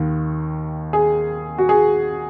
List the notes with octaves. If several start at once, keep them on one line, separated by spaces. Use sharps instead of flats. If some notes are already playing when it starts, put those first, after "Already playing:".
Already playing: D#2 D#3
G#4
F#4
G#4